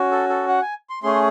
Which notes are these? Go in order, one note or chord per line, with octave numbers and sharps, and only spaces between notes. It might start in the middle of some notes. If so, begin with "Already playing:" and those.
Already playing: C#4 F#4
A4
A4
F#5
G#5
C6
A3 C#4 G#4 C6